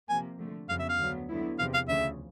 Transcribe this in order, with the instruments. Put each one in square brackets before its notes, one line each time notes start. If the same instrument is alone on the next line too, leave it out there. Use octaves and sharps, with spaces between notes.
[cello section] C3 F3 A#3 [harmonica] G#5
[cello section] D3 F3 A3
[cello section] F2 C#3 F#3 B3 [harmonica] F5
[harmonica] E5
F5
[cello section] D2 D3 F#3 B3
D3 F#3 B3 E4
[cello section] E2 C3 F3 [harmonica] F5
[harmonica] F5
[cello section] D2 C#3 F3 [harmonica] E5